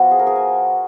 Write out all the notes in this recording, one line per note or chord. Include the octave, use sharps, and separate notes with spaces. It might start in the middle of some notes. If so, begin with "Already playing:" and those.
Already playing: F3 B3 F4 F#4
G#4
A#4
G#4
G#5